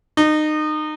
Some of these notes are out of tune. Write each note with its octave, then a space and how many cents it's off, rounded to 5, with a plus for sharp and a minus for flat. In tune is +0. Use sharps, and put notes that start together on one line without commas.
D#4 -25